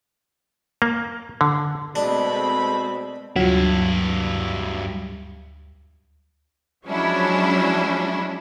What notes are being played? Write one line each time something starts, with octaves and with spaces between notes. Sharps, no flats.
A#3
D3
B2 G#3 A3 C4 D4 B5
D2 G2 F#3 E4 F4
F3 F#3 G#3 C#4 D4 E4